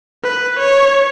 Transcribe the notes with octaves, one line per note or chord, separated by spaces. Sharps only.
B4
C#5